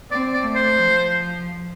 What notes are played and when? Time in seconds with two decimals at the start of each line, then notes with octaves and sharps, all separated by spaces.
0.11 C4 D5
0.34 D5
0.44 A3
0.55 C5
0.78 F3